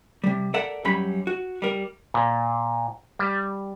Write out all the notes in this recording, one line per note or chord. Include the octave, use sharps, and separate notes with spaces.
C3 G3
A4 A#4 D5 E5 F#5
F#2 G3 C#4 B5
F#4
G3 A#4
A#2
G3